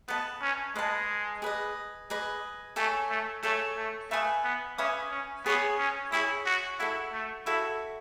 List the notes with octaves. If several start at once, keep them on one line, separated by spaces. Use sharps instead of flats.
B3 B4 D#5 A5
C#4
G#3 B4 D#5 A5
G#4 B4 D#5
G#4 B4 D#5
A3 A4 C#5 G#5
A3
A3 A4 C#5 G#5
A3
A3 B4 E5 G#5 D#6
B3
C#4 B4 E5 G#5 D#6
C#4
B3 G#4 C#5 G#5 D#6
C#4
E4 G#4 C#5 G#5 D#6
F#4
E4 F#4 A4 E5
A3
E4 F#4 A4 E5